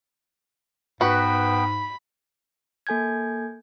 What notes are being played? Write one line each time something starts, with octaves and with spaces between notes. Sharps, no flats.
G#2 B3 F#4 B4 G5 B5
A#3 A4 G#5 G6 G#6